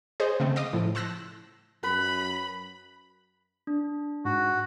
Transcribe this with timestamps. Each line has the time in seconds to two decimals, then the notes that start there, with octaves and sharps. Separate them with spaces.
0.20 G#4 C5 C#5 D#5
0.40 C#3 A3 C4
0.56 D#5 F5 D6 D#6
0.73 A2 F3
0.95 A5 C6 E6 F#6 A#6
1.83 F#2 B4 B5
3.67 D4
4.25 G#2 F#4